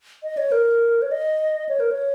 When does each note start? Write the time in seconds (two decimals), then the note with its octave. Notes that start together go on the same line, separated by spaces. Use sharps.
0.23 D#5
0.37 C#5
0.52 A#4
1.02 C#5
1.11 D#5
1.69 C#5
1.80 A#4
1.91 C#5